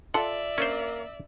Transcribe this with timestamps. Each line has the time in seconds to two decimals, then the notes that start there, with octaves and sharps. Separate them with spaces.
0.14 F4 A4 D5 E5 F#5
0.58 A#3 C#4 D4 C5